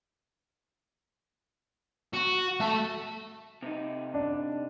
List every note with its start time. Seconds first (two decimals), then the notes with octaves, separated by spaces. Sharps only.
2.14 F#4
2.60 A3 A5
3.62 C3 D#4
4.14 D4